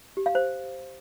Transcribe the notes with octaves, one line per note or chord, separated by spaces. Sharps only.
G4
F5
C5